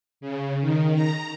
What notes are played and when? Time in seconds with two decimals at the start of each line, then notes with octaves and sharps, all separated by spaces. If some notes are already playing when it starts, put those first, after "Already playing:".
0.21 C#3
0.61 D#3
0.95 A#5